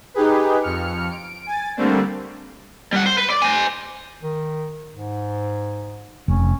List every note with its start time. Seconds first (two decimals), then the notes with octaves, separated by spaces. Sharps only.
0.14 D#4 G4 G#4 B4
0.62 F2 F6 C#7
1.10 D7
1.46 G#5 A6
1.77 D3 G3 A3 A#3 C4 D4
2.93 G3 F#5
3.06 C5
3.18 B4
3.30 D5
3.42 C5 G#5
4.23 D#3
4.92 G#2
6.28 F1 C#4